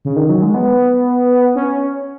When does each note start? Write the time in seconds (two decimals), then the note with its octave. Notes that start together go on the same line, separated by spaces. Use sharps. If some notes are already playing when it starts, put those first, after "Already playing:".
0.05 C#3
0.16 D#3
0.29 F#3
0.42 G#3
0.54 B3
1.55 C#4